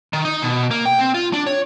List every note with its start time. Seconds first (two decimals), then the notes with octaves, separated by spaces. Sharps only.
0.13 D#3
0.25 D#4
0.42 B2
0.71 A#3
0.85 G5
0.99 C4
1.14 F4
1.33 D4
1.47 C#5